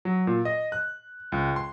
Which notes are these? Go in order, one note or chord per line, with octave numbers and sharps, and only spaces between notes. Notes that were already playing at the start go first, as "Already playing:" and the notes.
F#3
A#2
D#5
F#6
C#2
C6